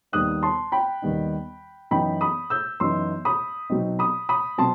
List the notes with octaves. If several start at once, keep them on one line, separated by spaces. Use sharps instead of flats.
D#2 D#3 G3 B3 D#4 D#6 F#6
A5 C6
G5 B5
D#2 D#3 G3 B3 D#4
F#2 E3 B3 D#4 G5 B5
B5 D#6
E6 G6
F#2 E3 B3 D#4 C6 E6
B5 D#6
B2 F#3 C4 D#4
B5 D#6
B5 D#6
B2 F#3 C4 A5 C6